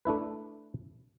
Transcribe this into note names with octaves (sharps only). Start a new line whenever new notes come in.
A3 D4 E4 B4